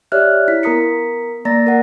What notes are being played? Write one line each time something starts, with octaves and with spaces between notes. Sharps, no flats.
G4 C#5 D5 E5 F6 F#6
E4 B6
B3 A#4 A#5 D#6 B6 C#7
A#3 D5 A#5 A6 A#6
A#4 F#5